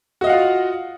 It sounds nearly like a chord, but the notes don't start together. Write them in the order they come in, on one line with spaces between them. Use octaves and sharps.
F#4 D#5 F5 F#5 F4